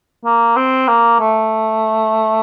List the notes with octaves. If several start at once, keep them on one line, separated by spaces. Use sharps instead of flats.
A#3
C4
A#3
A3